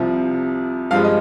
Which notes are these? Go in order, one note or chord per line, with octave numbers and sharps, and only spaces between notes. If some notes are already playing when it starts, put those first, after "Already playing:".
Already playing: C2 C3 F3
G2 F3 G#3 F5
D#5